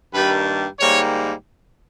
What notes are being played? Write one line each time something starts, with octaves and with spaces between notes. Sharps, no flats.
G2 D#3 G3 A#3 B4
G#2 D#3 G3 A#3 C#5